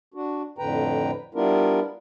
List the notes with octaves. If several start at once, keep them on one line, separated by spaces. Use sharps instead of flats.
D4 F#4
F2 A2 D3 B4 G5 A#5
G3 B3 D4 E4 F4 A#4